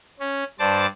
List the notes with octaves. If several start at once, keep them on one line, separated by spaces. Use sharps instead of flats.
C#4
G2 C5 D5 A5 A6